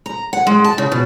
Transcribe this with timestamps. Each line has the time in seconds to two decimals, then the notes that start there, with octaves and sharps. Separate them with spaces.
0.06 A#5
0.33 F#5
0.47 G#3
0.64 A5
0.78 C#3
0.92 B2